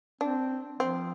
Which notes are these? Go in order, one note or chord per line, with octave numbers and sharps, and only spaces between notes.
C4 D4
F3 C4